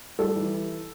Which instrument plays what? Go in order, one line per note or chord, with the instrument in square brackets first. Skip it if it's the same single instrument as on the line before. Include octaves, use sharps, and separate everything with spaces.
[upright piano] G3 A4
E3